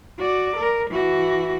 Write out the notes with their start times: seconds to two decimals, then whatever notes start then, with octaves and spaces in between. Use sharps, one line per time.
0.19 F#4 D5
0.57 A#4
0.91 E3 F#4